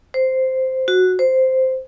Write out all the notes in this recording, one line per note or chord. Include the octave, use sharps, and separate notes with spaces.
C5
F#4
C5